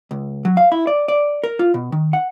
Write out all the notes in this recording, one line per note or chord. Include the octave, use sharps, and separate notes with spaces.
C#2
F#3
F5
E4
D5
D5
A#4
F4
B2
D#3
F#5